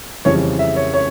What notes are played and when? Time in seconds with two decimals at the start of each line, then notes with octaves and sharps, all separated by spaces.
0.25 F2 C#3 E3 G3 C#5
0.59 E5
0.76 C#5
0.94 C#5